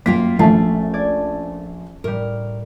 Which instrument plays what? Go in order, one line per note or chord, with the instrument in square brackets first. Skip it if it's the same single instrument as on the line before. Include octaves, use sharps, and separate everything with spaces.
[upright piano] F#2 B6 [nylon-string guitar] A#3 F4 G5
[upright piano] A#1 E5 A5 [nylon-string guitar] A3 [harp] C#4 C7
[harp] D5 G#6
[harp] A2 G3 [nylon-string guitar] A#4